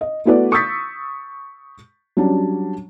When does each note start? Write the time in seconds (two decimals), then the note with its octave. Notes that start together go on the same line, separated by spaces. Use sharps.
0.01 D#5
0.25 A3 B3 E4 F#4 B4 D5
0.52 C#6 D#6 E6 G6 A6 B6
2.17 F#3 G3 C#4 D4